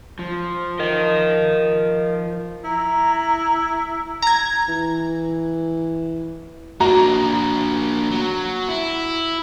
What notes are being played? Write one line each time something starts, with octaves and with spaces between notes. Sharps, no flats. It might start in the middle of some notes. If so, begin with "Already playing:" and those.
F3
A#4 D#5
E4 A#5
A#5 G#6
E3
A#3 D4 F#4 A#5
F#3
E4